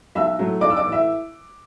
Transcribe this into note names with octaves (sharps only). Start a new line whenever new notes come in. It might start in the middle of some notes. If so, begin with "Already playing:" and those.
B1 E5 E6
A2 F#3 A3
B1 D5 D6
E6
D5 D6
A2 E3
E5 E6